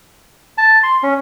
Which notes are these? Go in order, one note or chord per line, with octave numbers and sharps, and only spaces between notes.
A5
C6
C#4